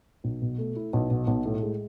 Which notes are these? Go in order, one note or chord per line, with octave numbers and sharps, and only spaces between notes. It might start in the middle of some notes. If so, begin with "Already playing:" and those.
B1
B2
A3
E4
B1
B2
B1
A2
G#3